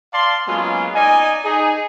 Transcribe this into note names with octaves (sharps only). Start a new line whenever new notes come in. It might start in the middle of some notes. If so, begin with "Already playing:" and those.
D5 F5 A5 C6
F#3 G#3 A#3 B3 C#4 F4
D#4 D5 D#5 G#5
D#4 G#4